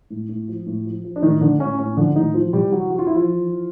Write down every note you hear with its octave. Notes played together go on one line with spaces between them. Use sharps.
A2
A2
F3
A2
F3
F3
D4
A2 D#3 D#4
A2 D3 D4
A2 C#4
A2 C#4
D3 F3 D4
A2 D#3 D#4
E3 F3 F4
C3 G3 G4
E3 F#3 F#4
E3 F#4
F4
E3 E4
F3 F4
E3
E3